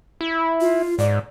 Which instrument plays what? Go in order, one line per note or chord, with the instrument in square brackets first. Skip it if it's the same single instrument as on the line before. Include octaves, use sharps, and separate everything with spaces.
[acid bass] E4
[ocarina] F4
[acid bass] G#2 [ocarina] D5